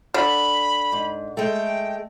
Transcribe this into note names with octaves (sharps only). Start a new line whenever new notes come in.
D3 B5
G#2
G#3 A3 G5